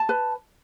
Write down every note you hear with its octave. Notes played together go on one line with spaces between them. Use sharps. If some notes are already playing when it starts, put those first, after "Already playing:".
Already playing: A5
B4